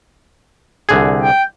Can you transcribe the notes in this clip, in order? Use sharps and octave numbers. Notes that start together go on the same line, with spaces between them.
C2 D3 G#4
G5